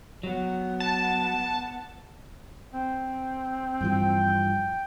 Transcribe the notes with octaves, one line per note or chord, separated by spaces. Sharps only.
F#3 B3 F#5
A5
C4
G2 E3 F3 G5